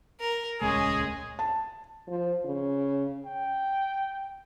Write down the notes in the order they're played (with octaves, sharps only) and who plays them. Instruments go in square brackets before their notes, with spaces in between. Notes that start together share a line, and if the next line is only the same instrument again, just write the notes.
[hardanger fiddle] A#4
[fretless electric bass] D#1 C#2 A3 [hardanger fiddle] G#3 C#4 [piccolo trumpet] G#4
[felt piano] A5
[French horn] F3
C#3
[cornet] G5